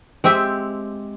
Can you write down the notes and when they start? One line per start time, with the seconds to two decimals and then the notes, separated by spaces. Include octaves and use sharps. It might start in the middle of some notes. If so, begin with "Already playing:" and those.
0.24 G#3 C4 G4 E5